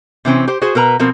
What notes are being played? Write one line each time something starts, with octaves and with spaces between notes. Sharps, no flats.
C3 E3 C4 C#4
G4 C5
F#4 G#4 C5
B2 A#4 B4 A#5
B2 F3 C4 A#4